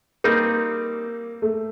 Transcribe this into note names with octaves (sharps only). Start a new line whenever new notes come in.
G3 A#3 C4 D#4
A3